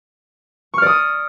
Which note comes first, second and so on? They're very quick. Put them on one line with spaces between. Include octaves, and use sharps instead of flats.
C#6 F6 D5 D#6